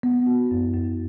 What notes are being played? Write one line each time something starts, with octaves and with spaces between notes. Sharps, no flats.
B3
F#4
F#2
F#2